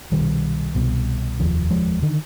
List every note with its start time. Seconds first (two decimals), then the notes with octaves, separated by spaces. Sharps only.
0.12 C2 B2 D#3 G3
0.75 C2 B2
1.40 F1 D#2 D3 F3
1.70 F3 G#3
2.02 D3 D#3